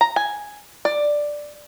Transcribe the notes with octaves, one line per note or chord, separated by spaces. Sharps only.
A#5
G#5
D5